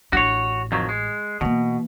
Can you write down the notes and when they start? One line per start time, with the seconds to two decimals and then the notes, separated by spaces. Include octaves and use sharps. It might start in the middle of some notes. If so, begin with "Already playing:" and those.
0.13 A1 D4 F#4 C#5
0.72 F2 D#3 F#3
0.89 G#3
1.41 B2 E3 A#3